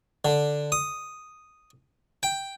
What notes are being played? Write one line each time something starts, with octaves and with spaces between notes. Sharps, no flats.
D3
D#6
G5